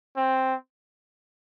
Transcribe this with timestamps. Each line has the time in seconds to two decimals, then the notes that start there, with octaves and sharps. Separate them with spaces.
0.17 C4